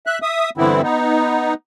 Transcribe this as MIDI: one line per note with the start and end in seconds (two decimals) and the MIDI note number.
0.07 0.19 76
0.07 0.19 90
0.22 0.50 76
0.22 0.50 87
0.58 0.82 43
0.58 0.82 50
0.58 0.82 52
0.58 0.82 59
0.58 0.82 60
0.58 0.82 64
0.83 1.54 59
0.83 1.54 63